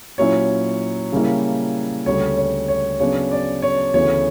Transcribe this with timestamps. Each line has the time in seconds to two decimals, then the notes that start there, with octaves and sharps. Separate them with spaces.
0.18 A#2 F#3 C#4 E4 C#5
1.12 C#3 G3 A#3 E4
2.06 D2 C#3 G3 C#5
2.37 C#5
2.68 C#5
3.00 C#3 F#3 B3 D4 C#5
3.32 D5
3.62 C#5
3.94 D2 C#3 E3 B3 E4 C#5